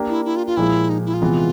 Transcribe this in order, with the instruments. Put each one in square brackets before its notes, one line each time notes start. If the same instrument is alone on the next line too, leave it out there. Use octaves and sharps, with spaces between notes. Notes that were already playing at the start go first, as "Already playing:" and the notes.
Already playing: [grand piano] A#3 D4 G4
[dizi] E4
E4
F4
F4
[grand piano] A#2 F3 G#3 [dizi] E4
[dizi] D#4
E4
F4
[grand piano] C3 E3 G#3 B3